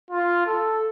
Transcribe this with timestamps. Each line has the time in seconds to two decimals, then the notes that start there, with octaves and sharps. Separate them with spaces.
0.11 F4
0.46 A4